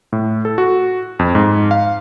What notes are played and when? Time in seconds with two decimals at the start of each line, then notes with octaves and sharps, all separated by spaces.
0.13 A2
0.45 A4
0.58 F#4
1.19 F2
1.35 G#2
1.71 F5